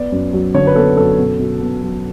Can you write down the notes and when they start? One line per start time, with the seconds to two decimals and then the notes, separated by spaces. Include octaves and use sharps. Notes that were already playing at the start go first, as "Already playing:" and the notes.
Already playing: B3 D5
0.12 F#2
0.33 F#3
0.54 D3 C#5
0.67 B4
0.75 B3 A4
0.97 F#2 A4
1.18 B2
1.40 B2
1.61 B3
1.82 F#3